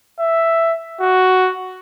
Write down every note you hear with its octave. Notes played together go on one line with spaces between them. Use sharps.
E5
F#4